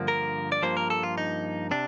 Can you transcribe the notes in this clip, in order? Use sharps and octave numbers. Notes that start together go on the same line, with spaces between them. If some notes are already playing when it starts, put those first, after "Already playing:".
Already playing: G2 D3 F3 A#3
A#4
D5
G2 F3 A#3 C5
A#4
A4
F4
D#4
C3 D4